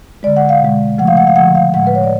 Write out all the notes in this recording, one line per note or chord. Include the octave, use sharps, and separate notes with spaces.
D3 G#3 D5
F#5
F5
B2 G#3
C#3 F3 A3 F#5
F5
F#5
F5
D3 F3 A3 F#5
F5
A2 G#3 F#5
B4
C#5
D5